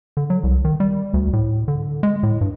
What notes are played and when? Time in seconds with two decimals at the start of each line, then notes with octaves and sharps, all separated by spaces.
0.17 D3
0.30 F#3
0.44 C2
0.65 D#3
0.80 G3
1.14 D2
1.33 A2
1.68 D3
2.03 G#3
2.23 A2
2.41 G2